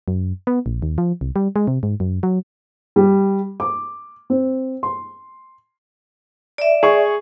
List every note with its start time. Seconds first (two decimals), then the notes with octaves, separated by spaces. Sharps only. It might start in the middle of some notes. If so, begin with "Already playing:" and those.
0.08 F#2
0.47 B3
0.66 A#1
0.82 D#2
0.98 F3
1.21 C2
1.36 G3
1.56 G#3
1.67 C3
1.83 G#2
2.00 F#2
2.23 F#3
2.96 G3
3.60 D6
4.30 C4
4.83 C6
6.58 D5 E5
6.83 G#4 C#6